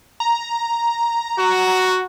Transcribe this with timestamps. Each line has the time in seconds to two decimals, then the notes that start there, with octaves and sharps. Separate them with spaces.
0.20 A#5
1.38 F#4